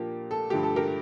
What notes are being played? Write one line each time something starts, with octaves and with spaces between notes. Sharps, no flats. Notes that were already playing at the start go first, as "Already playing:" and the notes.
Already playing: A#2 F3 A#3 D4 G4
A4
G2 D3 F3 A3 G4
A4
G4 A#4